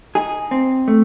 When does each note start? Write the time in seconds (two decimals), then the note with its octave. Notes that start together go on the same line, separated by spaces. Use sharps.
0.15 D#4 G#4
0.51 C4
0.88 A3